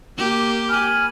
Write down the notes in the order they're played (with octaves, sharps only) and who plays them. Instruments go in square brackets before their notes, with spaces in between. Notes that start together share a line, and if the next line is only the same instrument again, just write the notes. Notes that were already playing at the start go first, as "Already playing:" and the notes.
[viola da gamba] A#3 G4
[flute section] G#5 B5 F6